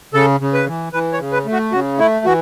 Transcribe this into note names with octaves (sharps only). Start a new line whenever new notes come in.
C#3 A4
C#3
B4
E3
E3 B4
C#5
C#3
B4
A3
F#4
C#3 F#4
A3 E4
E3 F#4